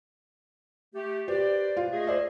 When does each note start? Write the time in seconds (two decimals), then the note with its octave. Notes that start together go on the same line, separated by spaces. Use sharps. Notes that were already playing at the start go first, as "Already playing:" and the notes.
0.95 A3 G4
1.28 G4 B4 C5 D5
1.77 F4
1.92 A3 G#4 D#5
2.07 C5 D5 E5